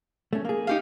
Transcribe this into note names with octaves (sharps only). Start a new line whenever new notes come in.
A3 C#4
A#3 G#4
D#4 G4 F5